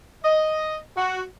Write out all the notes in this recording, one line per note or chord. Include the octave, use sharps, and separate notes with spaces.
D#5
F#4